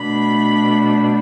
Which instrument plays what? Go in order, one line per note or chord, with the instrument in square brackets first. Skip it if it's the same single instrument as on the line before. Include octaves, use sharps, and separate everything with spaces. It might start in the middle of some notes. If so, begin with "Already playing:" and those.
Already playing: [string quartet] B2 A3 D4 B5